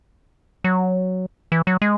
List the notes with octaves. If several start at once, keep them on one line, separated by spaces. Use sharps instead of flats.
F#3
E3
F#3
G#3